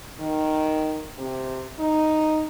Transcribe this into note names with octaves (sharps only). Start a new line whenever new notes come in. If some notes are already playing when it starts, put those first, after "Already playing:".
D#3
C3
D#4